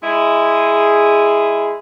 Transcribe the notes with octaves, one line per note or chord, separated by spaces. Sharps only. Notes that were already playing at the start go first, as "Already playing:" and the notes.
G#3 E4 G#4